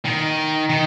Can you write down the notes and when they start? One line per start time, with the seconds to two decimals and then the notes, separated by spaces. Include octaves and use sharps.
0.05 D#3
0.70 D#3